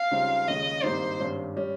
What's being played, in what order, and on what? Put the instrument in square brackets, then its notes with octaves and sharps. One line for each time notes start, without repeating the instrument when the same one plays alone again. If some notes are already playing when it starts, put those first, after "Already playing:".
Already playing: [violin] F5
[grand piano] C#2 C#3 G3 C4 D#4
[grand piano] D#2 C#3 G#3 [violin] D#5
[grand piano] G#1 G2 G3 A#3 D#4 [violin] C5
[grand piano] G#1 G2 G3 C#4
G3 C#4